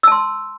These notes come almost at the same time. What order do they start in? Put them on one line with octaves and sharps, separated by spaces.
E6 A5 C6